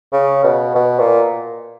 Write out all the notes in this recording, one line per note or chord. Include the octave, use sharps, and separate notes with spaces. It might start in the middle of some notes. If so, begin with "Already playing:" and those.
C#3
B2
B2
A#2